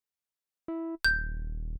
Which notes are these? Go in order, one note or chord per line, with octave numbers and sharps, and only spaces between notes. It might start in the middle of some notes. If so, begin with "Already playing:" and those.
E4
D#1 G6